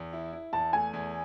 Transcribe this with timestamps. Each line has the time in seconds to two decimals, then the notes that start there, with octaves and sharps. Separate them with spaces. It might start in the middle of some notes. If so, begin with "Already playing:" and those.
Already playing: E2
0.13 E4
0.33 E4
0.53 E2 A5
0.73 A3 G#5
0.93 E2